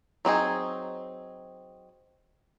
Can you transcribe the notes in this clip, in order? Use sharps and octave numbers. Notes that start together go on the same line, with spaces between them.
F#3 C4 D#4 G#4